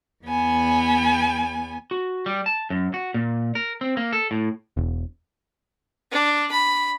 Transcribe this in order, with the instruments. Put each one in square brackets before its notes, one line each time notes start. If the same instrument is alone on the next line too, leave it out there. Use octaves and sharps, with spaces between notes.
[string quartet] E2 B3 G#5
[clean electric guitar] F#4
G3
A5
F#2
F#4
A#2
A#4
C4
A#3
A4
A2
[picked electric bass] E1
[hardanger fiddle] D4
B5